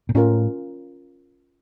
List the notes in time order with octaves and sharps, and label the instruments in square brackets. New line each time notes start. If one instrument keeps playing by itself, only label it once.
[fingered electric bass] A#2
[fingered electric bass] A2 [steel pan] C#4 F4 A#4